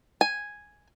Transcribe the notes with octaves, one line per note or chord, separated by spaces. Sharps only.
G#5